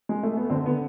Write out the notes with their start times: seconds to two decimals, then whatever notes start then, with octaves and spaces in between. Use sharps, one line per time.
0.09 G#3
0.23 A3
0.37 B3
0.50 D3 C4
0.66 B3